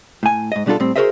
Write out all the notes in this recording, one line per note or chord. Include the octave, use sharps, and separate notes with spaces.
A2 G#5
G#2 D#5
B2 G3 D4 F4 A4
A2 G3 C4
F#4 G#4 A#4 C5 D#5 E5